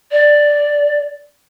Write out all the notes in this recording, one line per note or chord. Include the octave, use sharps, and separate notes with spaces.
D5